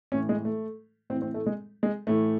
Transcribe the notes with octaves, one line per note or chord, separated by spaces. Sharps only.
A2 E3 C#4
G#3
A3
A2 E3 C4
C4
A3
G#3
G#3
A2 E3 A3